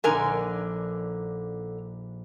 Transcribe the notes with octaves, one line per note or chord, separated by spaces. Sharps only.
A#1 D3 D#4 A#4 G#5